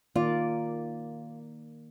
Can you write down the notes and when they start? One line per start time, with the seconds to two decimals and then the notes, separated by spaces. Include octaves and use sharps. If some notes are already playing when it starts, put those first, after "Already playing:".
0.16 D#3 A#3 F4 D5